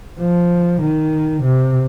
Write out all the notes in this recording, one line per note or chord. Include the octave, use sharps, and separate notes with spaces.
F3
D#3
C3